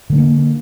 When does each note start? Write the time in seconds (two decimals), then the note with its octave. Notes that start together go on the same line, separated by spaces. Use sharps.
0.10 D3
0.13 G#3
0.15 D4
0.18 A#3